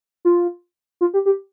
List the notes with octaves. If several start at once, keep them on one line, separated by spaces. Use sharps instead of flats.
F4
F4
G4
G4